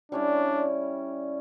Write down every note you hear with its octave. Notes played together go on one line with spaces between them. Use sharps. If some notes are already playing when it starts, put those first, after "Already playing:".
G3 C#4 D4 E4